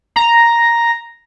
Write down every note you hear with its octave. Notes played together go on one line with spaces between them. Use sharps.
A#5